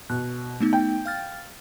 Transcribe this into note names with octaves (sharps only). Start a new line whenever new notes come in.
B2 F#6
A3 B3 D#4
G5
F5 F6 A6